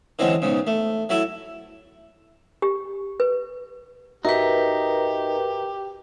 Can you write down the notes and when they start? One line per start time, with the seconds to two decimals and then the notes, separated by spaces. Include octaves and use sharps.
0.19 D3 E3 F#3 G#3 C4 C#4
0.42 B1 G#2 C#3
0.67 A3
1.09 F#3 A3 E4 A4
2.62 G4
3.20 B4
4.25 G#2 D#4 F#4 G4 A#4 B4 E5